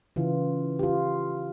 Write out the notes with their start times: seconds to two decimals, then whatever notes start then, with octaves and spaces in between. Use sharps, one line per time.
0.16 C#3 E3 F4
0.79 F4 G4